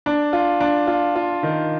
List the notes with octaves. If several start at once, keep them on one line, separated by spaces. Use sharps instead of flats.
D4
F4
D4
F4
F4
D#3